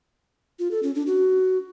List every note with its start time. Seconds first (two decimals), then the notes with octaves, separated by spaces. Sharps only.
0.59 F4
0.71 A4
0.83 C#4
0.95 D4
1.07 F#4